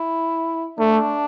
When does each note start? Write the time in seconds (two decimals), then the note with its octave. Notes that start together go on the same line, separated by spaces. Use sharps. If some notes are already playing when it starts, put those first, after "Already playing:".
Already playing: E4
0.79 A3 D4